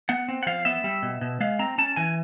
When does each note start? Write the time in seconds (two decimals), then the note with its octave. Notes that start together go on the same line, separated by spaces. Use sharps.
0.09 B3 F#5
0.28 C4
0.43 F#5
0.47 F3 F5
0.65 B3 E5
0.84 G3
1.02 B2
1.21 B2
1.40 G#3 F5
1.59 C4 A#5
1.78 C#4 A5
1.96 E3 G#5